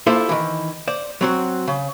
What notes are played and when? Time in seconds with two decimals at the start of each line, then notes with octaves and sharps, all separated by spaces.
0.07 A#3 E4 F4 A4 C5 E5
0.29 D#3 E3
0.88 C5 D5
1.21 F#3 C4 F#4
1.68 C#3